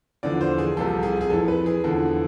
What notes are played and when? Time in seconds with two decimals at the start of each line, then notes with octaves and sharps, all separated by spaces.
0.23 E2 D3 F3 D5
0.41 C5
0.58 G#4
0.76 C2 C3 F3 A4
1.03 G#4
1.21 G#4
1.30 F2 E3 A4
1.48 B4
1.66 G#4
1.84 E2 D3 F3 A4